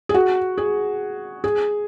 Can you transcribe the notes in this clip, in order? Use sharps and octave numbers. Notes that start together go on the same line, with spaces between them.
G#4
F#4
G#4
G#4